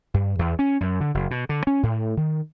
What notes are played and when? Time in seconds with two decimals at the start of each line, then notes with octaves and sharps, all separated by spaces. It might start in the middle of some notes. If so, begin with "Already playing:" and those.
0.14 G2
0.39 E2
0.59 C#4
0.81 F#2
1.00 D3
1.14 F#1
1.31 B2
1.49 D3
1.67 C#4
1.83 A2
2.17 D#3